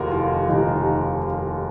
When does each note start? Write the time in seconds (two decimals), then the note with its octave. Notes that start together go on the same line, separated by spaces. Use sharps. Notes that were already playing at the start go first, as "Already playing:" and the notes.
Already playing: F1 D#2 D#3 F4 F#4 A#4
0.12 F4
0.30 D#4
0.48 F1 D#2 D#3 D#4